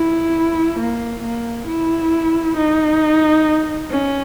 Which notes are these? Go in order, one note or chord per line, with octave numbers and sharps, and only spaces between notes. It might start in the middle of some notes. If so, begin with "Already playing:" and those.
Already playing: E4
A#3
A#3
E4
D#4
C#4